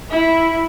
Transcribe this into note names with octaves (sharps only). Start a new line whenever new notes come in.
E4